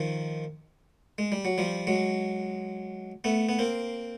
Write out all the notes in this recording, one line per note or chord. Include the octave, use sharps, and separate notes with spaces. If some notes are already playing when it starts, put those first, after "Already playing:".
Already playing: D#3 F3
G#3
G3
F#3
F3 G3
F#3 G#3
A3 B3
B3
A#3 C4